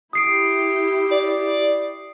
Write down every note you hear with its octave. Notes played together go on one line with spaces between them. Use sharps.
E4 G4 D#6 C7 D7
D5